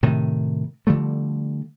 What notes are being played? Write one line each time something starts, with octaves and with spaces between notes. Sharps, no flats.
A2 C3 D#3
D3 F3 G3 A3